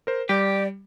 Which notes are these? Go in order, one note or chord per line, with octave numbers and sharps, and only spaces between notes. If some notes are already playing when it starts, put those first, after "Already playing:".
A#4 C5
G3 G4 D5